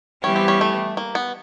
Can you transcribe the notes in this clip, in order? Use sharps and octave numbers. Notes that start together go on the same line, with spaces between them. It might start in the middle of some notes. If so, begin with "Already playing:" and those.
E3 G3 B3 C#4 E4 G4
C4
C#4
A3
A#3
B3